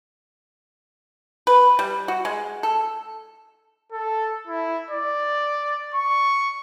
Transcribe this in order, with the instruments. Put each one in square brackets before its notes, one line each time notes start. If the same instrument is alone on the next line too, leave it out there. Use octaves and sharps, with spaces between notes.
[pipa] B4
G3
F#4
G#3
A4
[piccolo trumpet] A4
E4
D5
C#6